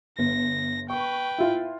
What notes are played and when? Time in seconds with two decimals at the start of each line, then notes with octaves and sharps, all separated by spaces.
0.18 G1 A#6
0.90 B4 G5 C#6
1.38 E4 F4